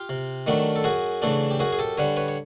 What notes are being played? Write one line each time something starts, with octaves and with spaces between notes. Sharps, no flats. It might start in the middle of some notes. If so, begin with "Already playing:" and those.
Already playing: F4 G4
C3
D#3 F#3 A3 D4
A4
F#2 F#4 G#4
C#3 E3 A3 D4
G4
F#2 F#4 G#4
G#4
G4 A4
D3 G3 B4 C#5
B4 C#5
C#5